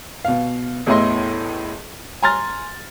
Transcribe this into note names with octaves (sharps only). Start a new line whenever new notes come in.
B2 F5
A1 E2 A2 E4 D#5 C6
G#5 A#5 C6 F6 A6